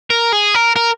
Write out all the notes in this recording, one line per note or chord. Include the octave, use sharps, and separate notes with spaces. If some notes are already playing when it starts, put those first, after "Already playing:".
A#4
G#4
A#4
A#4